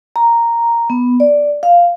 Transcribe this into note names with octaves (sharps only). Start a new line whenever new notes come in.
A#5
B3
D5
F5